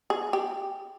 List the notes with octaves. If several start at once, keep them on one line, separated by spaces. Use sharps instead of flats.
G#4
G4